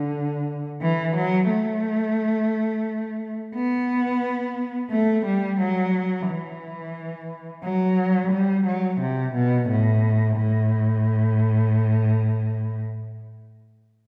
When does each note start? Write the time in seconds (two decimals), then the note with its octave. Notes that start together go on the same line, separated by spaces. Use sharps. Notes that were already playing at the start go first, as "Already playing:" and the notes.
Already playing: D3
0.81 E3
1.16 F#3
1.50 A3
3.55 B3
4.91 A3
5.25 G3
5.59 F#3
6.28 E3
7.64 F#3
8.31 G3
8.66 F#3
9.00 C3
9.35 B2
9.68 A2
10.36 A2